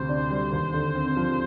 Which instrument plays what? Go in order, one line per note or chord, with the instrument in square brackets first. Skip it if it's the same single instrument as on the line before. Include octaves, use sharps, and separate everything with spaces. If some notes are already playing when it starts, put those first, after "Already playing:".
Already playing: [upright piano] D2 C3 [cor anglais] C5
[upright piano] D4
G3
D#2
D3
C4
F3